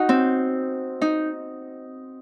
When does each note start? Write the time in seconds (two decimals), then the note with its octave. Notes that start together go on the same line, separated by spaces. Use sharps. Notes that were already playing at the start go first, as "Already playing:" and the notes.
Already playing: D#4 F#4
0.09 C4
1.01 D#4